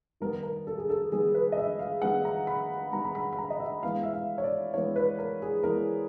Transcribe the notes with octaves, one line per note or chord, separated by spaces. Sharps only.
D#3 G3 B3 A#4
A#4
A4
G#4
A4
D#3 G3 B3 G#4
B4
D#5
E5
F5
D#3 G3 B3 F#5
A#5
B5
D#3 G3 B3 A#5
A#5
B5
B5
A#5
D#5
E5
E3 G#3 B3 F5
E5
F5
C#5
D5
E3 G#3 B3 C#5
B4
A#4
G#4
E3 G#3 B3 A#4